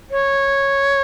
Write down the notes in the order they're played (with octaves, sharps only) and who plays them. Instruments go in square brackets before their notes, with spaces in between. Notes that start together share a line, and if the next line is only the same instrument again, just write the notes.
[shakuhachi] C#5